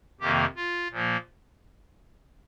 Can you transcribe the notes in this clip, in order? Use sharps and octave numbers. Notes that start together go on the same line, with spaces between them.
F2 C3 D#3 A#3 G4
F4
A#2 F3 A#3